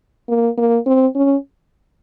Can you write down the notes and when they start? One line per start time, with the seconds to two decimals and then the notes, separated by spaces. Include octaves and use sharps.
0.28 A#3
0.57 A#3
0.86 C4
1.15 C#4